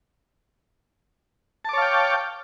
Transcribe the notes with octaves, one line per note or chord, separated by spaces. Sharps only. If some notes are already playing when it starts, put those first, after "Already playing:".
C#5 F5 G5 A5 D6